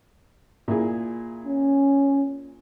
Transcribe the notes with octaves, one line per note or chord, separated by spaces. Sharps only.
A#2 E4 G#4
C#4